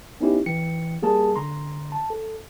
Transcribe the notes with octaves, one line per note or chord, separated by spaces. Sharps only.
B3 C#4 D#4 E4 G4
E3 G5 C#7
G3 A#3 G#4 A#4 A5
D3 A#5 C6
A5
A4